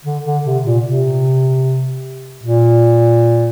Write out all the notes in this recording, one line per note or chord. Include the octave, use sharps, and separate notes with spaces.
D3
D3
C3
A#2
C3
A#2